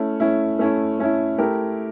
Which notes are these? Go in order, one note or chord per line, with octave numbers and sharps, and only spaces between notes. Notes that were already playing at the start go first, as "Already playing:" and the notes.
Already playing: A3 C#4 E4
A3 C#4 E4
A3 C#4 E4
A3 C#4 E4
A3 E4 G4 A#4